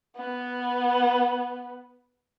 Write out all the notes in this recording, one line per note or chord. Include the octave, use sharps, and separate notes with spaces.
B3